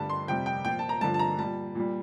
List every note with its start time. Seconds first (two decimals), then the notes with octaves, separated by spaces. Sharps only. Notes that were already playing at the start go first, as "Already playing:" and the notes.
Already playing: G2 D3 G3 A5
0.10 C6
0.28 F2 C3 G3 G5
0.46 G5
0.65 A#2 F3 G5
0.79 A5
0.89 A#5
1.01 G2 D3 F3 A5
1.14 A5
1.19 A#5
1.39 A#2 G3 A5
1.75 A#2 G3